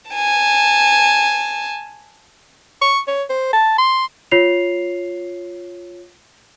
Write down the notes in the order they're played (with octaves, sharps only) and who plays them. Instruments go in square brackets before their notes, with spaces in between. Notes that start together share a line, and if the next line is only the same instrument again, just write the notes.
[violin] G#5 A5
[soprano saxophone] C#6
C#5
C5
A5
C6
[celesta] F4 C#5 C7 F7